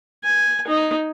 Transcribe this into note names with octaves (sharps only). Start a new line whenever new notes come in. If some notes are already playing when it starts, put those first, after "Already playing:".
G#5
D#4